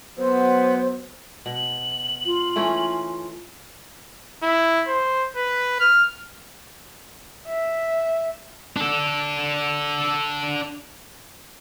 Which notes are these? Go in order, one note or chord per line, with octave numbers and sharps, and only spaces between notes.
F#3 B3 C5
B2 F#7
F4
E3 A3 C#4
E4
C5
B4
F6
E5
D4 A4